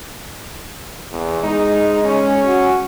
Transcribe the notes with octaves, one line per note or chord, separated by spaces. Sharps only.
E2
G#3 D#4
C#4
F#4